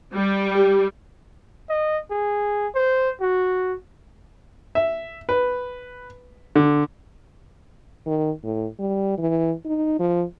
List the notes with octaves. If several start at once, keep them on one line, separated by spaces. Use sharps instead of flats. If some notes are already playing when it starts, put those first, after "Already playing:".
G3
G4
D#5
G#4
C5
F#4
E5
B4
D3
D#3
A2
G3
E3
D#4
F3